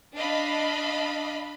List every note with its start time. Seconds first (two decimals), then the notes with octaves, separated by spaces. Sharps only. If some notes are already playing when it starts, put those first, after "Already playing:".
0.15 D4 D#5 F5 B5